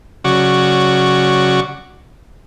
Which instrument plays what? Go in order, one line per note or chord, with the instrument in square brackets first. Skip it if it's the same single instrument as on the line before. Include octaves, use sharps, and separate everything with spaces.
[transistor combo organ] C#3 F#3 F#4 D5 C#6